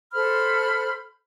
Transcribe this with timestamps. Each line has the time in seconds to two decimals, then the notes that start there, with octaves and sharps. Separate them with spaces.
0.13 A4 C5 B5 F6